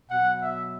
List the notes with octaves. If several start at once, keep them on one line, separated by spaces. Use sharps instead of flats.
B2 F#3 F#5
E5